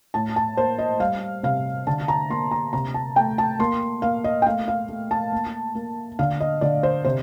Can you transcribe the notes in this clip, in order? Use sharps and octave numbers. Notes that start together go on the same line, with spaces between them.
A2 A5
A5
A#3 C5
D#5
G3 F5
C3 F5
D3 A5
A#5
A#3 C6
A#5
C3 A#5
A5
A3 G5
A5
A#3 C6
A#3 F5
D#5
G5
A3 F5
F5
A3
A5
A#3
A#3
D3 F5
D#5
D3 D5
C5
C3 C5